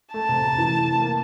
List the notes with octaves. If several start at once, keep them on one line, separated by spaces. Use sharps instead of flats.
A3 A5
C3
C3
E3
A3
C3
A#3